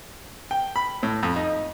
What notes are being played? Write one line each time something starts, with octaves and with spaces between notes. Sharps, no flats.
G5
B5
A2
F2
D#4